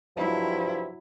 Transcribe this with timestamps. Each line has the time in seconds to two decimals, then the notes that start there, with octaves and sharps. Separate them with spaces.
0.17 G2 C3 F3 F#3 E4